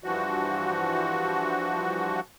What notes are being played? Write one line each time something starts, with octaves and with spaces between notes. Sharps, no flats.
G2 E3 F3 F#4